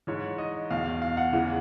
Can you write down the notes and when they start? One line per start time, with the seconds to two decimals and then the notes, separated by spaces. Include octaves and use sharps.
0.07 G#2 E3 C#5
0.38 D#5
0.70 E2 B2 F5
0.86 F5
1.02 F5
1.17 F#5
1.33 E2 C#3 E3